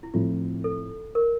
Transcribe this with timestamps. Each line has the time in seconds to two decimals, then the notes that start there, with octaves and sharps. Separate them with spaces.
0.03 E4
0.14 A2 F3 C4 E4 F4
0.64 A4
1.15 A#4